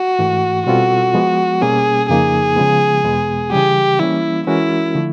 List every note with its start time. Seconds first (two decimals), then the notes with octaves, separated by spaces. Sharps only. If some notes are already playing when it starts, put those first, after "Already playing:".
Already playing: F#4
0.19 G#2 E3 A3
0.67 B2 G3 C4 F4 F#4 A4
1.14 F3 G#3 B3
1.61 B2 G3 A#3 C#4 G#4
2.09 F2 C#3 F3 A#3 D#4 G#4
2.56 C#3 F3 G#3 B3
3.04 E2 B2 G#3 B3
3.52 C#3 E3 G3 G4
3.99 E3 G3 A#3 C#4 E4
4.47 E3 G#3 C#4 E4 F#4 A#4
4.95 D3 F3 A3